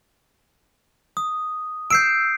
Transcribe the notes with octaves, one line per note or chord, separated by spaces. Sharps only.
D#6
E6 G6 C7 D7